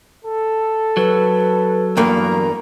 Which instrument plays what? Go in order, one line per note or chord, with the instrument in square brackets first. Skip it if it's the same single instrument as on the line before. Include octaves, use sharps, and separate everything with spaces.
[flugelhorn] A4
[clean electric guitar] F#3 [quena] B4
[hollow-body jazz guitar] E2 G2 A#3 [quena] A#5